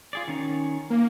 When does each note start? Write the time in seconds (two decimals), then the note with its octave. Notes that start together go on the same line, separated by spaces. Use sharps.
0.13 F4 G#4 D5
0.28 D#3 C#4 A#5
0.90 A#3